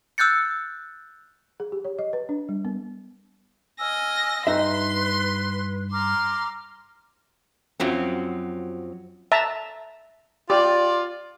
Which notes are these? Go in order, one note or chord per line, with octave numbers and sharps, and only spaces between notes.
E6 F#6 G6 A6 C#7
G#4
G4
C#5
D#5
B4
D4
G3
B3
D#5 G#5 E6 F6 A#6
G2 D#4 B4 E5 C6
A#5 C6 D6 F6
F#2 F3 F#3 C4
E5 A5 A#5
F4 G4 D5